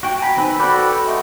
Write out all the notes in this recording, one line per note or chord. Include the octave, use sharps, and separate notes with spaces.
F#4 G5
G#5 A#5 B5
D#3 C4 B4
F#4 A4 B4 D5 G5
G#3 A3